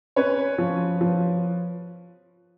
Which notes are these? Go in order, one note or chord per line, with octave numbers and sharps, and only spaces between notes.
C#4 B4 C#5
F3
F3